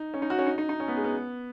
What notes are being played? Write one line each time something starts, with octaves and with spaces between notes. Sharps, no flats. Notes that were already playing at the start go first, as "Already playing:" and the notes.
Already playing: D#4
C#4
D#4
F#4
C#4
D#4
D#4
D#4
C#4
B3
G#3
B3